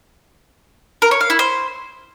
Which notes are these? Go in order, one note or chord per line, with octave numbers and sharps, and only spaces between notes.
A#4
C#5
F5
E4
C5